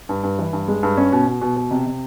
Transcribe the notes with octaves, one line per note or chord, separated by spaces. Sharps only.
G2
G2
E3
G2
G#3
G2
C#4
B2
B2
B2
B2
C3
C3